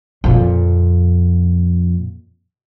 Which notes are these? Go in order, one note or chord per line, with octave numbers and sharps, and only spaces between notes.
F2 A#2